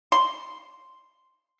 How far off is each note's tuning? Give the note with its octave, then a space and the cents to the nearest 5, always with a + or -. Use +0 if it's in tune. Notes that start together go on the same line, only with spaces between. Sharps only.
C6 -5